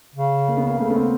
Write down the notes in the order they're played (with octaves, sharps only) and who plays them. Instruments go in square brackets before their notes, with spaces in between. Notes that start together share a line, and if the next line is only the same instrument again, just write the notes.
[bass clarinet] C#3
[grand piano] A#3
B3
A#3
[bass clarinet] C#3 [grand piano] A3
[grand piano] B3
C4